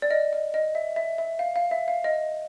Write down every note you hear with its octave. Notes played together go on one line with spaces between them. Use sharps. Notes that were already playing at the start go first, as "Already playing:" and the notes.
D5
D#5
D#5
D#5
E5
E5
E5
F5
F5
E5
F5
D#5